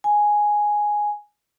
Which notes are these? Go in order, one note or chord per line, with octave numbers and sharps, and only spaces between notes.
G#5